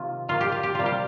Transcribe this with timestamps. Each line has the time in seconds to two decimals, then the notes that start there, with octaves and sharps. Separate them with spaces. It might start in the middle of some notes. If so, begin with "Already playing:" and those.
Already playing: C3 D#3 A#3 F4
0.28 D#3 A#3 F4
0.41 G4
0.52 F4
0.63 G4
0.75 C3 G3 A#3 F4
0.86 G4